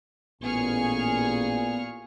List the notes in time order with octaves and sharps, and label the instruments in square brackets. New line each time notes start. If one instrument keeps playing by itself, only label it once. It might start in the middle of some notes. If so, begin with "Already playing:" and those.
[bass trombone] A1 [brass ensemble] A#2 [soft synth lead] B3 [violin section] G#4 C#6 F6